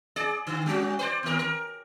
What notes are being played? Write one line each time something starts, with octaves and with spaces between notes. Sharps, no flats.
G#4 D5
D3
G3 C#4 F#4
B4 C5 D5
D#2 A#4
A#4